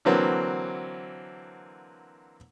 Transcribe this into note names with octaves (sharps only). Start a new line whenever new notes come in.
D3 E3 F#3 A#3 C4